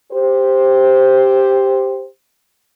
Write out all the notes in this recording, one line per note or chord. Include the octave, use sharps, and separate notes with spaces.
G4 C5